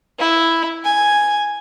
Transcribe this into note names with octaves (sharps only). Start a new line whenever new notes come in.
E4
G#5